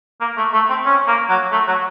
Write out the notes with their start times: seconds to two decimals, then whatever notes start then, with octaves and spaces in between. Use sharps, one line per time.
0.21 A#3
0.37 A3
0.53 A3
0.69 C4
0.86 C#4
1.08 A#3
1.29 F#3
1.51 A3
1.67 F#3